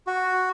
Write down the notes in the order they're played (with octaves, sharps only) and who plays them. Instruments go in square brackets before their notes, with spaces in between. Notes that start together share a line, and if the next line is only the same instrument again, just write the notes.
[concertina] F#4